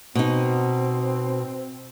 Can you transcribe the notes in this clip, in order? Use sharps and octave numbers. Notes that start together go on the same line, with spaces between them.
B2 C4 D#4